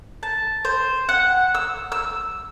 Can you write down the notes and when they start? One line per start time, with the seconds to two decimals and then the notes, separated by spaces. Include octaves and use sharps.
0.23 A5
0.65 C5
1.09 F#5
1.55 E6
1.92 E6